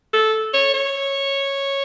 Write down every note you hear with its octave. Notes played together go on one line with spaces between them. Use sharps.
A4
C#5
C#5